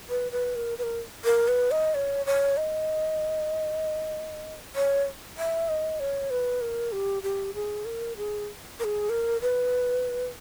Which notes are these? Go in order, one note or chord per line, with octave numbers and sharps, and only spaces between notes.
B4
B4
A#4
B4
A#4
A#4
B4
D#5
C#5
C#5
D#5
C#5
E5
D#5
C#5
B4
A#4
G4
G4
G#4
A#4
G#4
A#4
G#4
A#4
B4